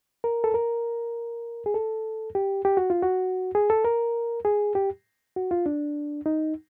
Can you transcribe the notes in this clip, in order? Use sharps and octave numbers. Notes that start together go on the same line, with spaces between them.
A#4
A4
A#4
G#4
A4
G4
G4
F#4
F4
F#4
G#4
A4
A#4
G#4
G4
F#4
F4
D4
D#4